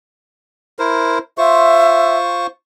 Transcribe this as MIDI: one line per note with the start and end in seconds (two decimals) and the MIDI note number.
0.79 1.19 64
0.79 1.19 70
0.79 1.19 72
1.38 2.47 65
1.38 2.47 72
1.38 2.17 76
1.38 2.47 85